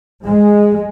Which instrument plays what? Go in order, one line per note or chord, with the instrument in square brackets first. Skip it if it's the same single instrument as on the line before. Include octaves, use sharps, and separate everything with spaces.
[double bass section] G#3